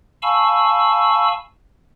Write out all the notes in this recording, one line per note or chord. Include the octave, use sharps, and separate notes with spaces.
F5 G#5 A5 B5 C#6 E6